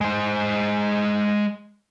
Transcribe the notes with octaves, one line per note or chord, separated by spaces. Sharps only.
G#3 C5